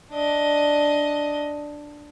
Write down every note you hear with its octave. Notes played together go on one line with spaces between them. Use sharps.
D4 D#5